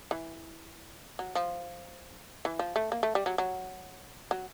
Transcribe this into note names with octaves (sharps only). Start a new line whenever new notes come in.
E3
F#3
F3
E3
F3
A3
A#3
A3
G3
F#3
F#3
F#3